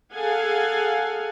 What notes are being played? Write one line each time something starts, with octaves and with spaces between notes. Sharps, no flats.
G#4 A4 F5 F#5 G#5